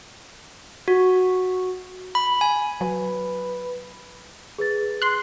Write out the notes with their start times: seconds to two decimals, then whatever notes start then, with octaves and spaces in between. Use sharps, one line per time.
0.88 F#4
2.15 B5
2.41 G#5
2.81 F#3 B4
4.58 G#4 B4 A6
5.02 C6 F#6